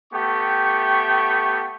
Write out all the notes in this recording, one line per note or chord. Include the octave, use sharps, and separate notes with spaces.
A3 B3 G4 G5 C#6